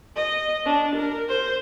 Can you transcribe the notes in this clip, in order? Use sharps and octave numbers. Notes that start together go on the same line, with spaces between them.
D#5
D4
A#4
C5